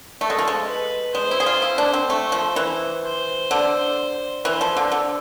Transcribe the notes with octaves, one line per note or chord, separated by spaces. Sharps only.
A3 A4
G#3
F3
G#3
B4
G#3 C5
E4
G#4
F4
E4
D4
C4
A3 C5
F3
E3
C5
D3
E3 C5
F3
D3
D3